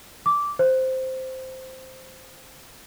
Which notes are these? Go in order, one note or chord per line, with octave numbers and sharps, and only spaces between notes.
D6
C5